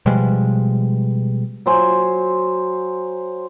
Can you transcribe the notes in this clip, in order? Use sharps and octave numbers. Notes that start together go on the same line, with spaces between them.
B2 F3 G3 G#3
F#3 C5 G#5